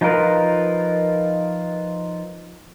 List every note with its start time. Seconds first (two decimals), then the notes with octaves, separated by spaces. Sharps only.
0.01 F3 D#4 F4 A#4 B4